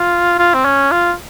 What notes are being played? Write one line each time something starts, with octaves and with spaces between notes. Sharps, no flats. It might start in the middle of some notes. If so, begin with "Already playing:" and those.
Already playing: F4
F4
C4
C#4
F4